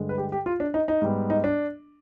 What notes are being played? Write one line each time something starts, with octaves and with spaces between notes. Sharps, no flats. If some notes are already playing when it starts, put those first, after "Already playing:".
Already playing: G2 D3 G#3
B4
G4
G4
F4
D4
D#4
D#4
G#2 G3 B3
D#4
D4